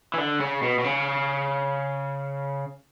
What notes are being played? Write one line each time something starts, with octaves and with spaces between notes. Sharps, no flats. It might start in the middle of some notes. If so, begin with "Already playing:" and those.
E3
D3
C#3
B2
B2
C#3